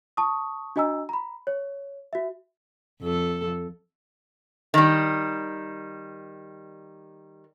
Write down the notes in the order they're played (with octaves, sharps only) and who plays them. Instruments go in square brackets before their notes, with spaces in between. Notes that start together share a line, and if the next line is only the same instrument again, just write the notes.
[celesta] A5 C#6 D#6
D4 F#4 D#5 G#5 A#5 E6
A#5 B5
C#5
F#4 E5
[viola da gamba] F2 A4
[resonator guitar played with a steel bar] D#3 G3